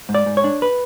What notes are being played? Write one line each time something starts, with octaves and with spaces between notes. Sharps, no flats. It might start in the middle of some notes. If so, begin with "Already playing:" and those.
G#2
D5
G#2
C#5
D4
B4